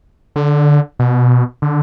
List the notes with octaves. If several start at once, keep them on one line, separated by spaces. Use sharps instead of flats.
D3
B2
D3